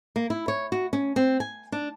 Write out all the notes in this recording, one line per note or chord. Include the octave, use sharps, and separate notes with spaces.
A#3
E4
C#5
F#4
C#4
C4
G#5
D4